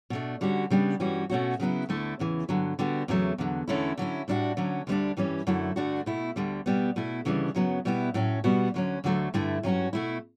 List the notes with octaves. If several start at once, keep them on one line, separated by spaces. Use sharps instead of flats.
B2 A3 D4
D3 G3 C#4 F#4
C#3 G3 B3 D4
G2 E3 G3 C#4 F#4
B2 A3 C#4 F#4
C#3 F#3 B3 E4
D2 D3 A3 E4
E2 C#3 E3
G2 D3 F#3
D3 G3 B3 F#4
E2 C#3 F#3 A3
E2 D3 F#3
E2 D3 A3 C#4 E4
D3 F#3 C#4 E4
A2 G3 D4 F#4
D2 D3 F#3 C#4
D2 D3 G3 B3 D4
G2 E3 G3 C#4
F#2 D3 F#3 A3 E4
G2 D3 A3 D4 F#4
B2 A3 E4
D2 D3 G3
B2 G3 B3
B2 A3 E4
D2 C#3 E3 G3 D4
F#2 C#3 F#3 B3
B2 G3 B3 E4
A2 F#3 C#4
B2 G3 B3 F#4
D2 D3 F#3 C#4
D2 D3 F#3 A3
G2 D3 A3 E4
G2 F#3 C#4 F#4
B2 A3 E4